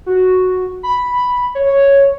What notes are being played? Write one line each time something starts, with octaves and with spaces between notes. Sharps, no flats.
F#4
B5
C#5